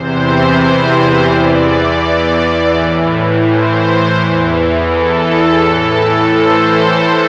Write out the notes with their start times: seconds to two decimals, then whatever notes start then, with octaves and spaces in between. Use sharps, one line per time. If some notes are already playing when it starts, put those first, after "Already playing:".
Already playing: E2 C3 E3 C5
1.28 E2 E3 D5
2.71 A2 E3
3.43 C5
4.15 E2 E3
4.87 A4
5.23 A4
5.58 A2 E3 A4
6.30 C5